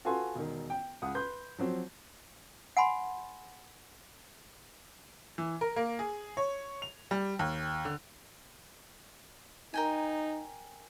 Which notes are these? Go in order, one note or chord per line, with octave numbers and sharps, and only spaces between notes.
F4 F#4 A4 B4 G#5 C6
E1 D#3
G5
C#2 F#5 D#6
B4 C6 G6
F3 F#3 C4
F#5 G#5 B5 C6
E3
A#4
A#3
G#4
C#5
F7
G3
D#2
D3
D#4 A#4 G5 G#5